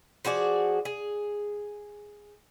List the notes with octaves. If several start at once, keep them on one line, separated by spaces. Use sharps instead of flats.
F3 F#4 G#4 D5
G#4